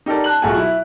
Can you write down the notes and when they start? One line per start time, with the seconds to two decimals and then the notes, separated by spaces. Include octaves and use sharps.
0.06 D#4 G4 A4 A#4 D5
0.24 A5 F#6 F#7
0.42 B1 A3 F4 F#4 G#4 G#5
0.56 E4